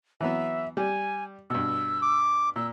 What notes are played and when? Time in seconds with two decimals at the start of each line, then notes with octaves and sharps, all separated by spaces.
0.21 E3 F#3 B3 E5
0.77 G3 G#5
1.50 G2 B2 E6
2.02 D6
2.56 A#2 E6